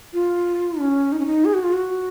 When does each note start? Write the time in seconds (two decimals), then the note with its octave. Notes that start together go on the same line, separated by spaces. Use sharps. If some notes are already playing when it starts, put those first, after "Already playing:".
0.13 F4
0.80 C#4
1.12 D#4
1.19 C#4
1.26 D#4
1.45 G#4
1.54 F#4
1.63 F4
1.73 F#4